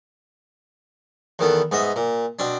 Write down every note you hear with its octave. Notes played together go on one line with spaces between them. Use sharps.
E2 D#3 B3 A4
G#2 B3 D#5 E5
A#2
B2 C4 D4